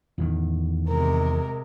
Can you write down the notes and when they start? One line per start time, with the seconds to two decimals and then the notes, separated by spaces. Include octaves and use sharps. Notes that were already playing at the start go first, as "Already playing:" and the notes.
0.18 E2 A2 D#3
0.88 C3 G#3 A#4